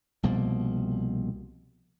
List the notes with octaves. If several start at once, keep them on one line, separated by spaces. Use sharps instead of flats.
C2 B2 F3 A#3